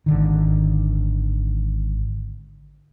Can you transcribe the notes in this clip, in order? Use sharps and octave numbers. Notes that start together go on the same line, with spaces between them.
G#1 D3 D#3